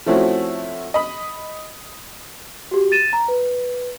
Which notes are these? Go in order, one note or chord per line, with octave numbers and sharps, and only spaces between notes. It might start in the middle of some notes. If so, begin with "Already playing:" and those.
F3 A3 C4 C#4 E4 F#4
D#5 B5
F#4 G4
A6 D#7 E7
A#5
B4